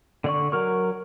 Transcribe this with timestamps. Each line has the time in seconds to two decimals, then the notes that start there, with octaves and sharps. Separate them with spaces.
0.24 D3 D5 C#6
0.52 F#3 A#4 C#6